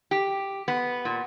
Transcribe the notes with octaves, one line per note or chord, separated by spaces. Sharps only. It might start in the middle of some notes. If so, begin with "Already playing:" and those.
G4
B3
A#2